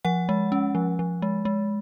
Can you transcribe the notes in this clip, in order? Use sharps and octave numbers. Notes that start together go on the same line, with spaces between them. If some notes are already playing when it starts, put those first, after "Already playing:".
F3 F#5
G#3
C#4
F3
F3
G#3
G#3